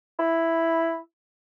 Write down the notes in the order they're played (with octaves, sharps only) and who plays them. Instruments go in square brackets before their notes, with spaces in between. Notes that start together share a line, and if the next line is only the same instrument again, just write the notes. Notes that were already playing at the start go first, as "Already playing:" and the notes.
[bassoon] E4